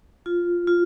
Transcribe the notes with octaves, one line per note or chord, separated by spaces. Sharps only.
F4
F4